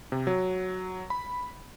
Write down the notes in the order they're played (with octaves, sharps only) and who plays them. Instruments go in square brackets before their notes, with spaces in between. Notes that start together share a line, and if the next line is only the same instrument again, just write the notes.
[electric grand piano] C3
F#3
B5